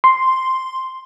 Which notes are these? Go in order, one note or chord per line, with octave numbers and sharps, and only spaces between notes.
C6